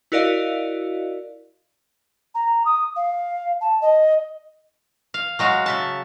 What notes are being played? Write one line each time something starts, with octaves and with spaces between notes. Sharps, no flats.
E4 F#4 A#4 D5 D#5 F5
A#5
D#6
F5
A5
D#5
F5
F#3 G#3 F#4 F5
C#3 E5 A5